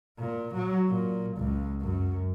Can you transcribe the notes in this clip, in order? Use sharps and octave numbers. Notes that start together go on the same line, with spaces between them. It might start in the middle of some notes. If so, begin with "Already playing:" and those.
A#2
F#3
A#2
C#2
F#2